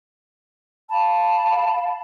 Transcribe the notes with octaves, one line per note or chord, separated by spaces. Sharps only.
F5 A5 B5